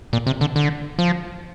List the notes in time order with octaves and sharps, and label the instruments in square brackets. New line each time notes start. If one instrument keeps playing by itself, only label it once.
[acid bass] A#2
C3
D3
D3
F3